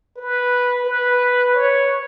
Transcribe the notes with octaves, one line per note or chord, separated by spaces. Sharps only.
B4
B4
C#5